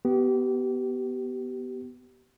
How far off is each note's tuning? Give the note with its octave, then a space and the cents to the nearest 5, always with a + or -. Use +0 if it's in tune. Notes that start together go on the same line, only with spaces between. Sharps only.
B3 +0 G4 -30